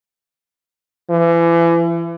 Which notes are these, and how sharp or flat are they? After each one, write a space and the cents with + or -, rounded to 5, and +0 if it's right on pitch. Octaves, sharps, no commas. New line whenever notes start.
E3 +35